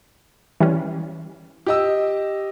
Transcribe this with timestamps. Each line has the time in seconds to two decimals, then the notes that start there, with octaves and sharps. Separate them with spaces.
0.60 E3 G3 C#4
1.67 G4 D#5 E6